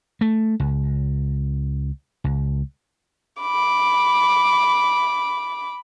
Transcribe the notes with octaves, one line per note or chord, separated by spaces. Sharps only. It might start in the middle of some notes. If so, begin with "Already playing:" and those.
A3
C#2
C#2
B5 D6